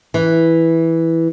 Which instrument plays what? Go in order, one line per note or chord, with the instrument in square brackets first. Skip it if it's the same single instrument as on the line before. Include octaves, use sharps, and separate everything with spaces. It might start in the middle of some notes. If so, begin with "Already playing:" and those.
[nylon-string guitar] E3